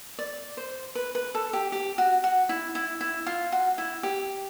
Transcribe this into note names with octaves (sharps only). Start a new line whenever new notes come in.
D5
C5
B4
B4
A4
G4
G4
F#4
F#4
E4
E4
E4
F4
F#4
E4
G4